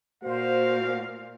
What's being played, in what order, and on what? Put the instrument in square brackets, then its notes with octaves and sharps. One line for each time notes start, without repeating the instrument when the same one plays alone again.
[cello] A#2 [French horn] F#4 [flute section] C5 [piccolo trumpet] F5